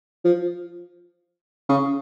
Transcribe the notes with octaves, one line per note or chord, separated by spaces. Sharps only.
F3
C#3